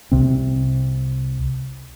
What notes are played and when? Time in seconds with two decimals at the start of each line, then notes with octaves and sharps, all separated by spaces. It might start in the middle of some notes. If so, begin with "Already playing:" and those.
0.12 C2 C3 C4